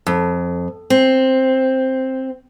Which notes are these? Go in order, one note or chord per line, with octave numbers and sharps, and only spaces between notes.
F2
C4